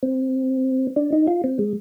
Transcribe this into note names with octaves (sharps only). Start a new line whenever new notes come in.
C4
D4
D#4
F4
C4
G#3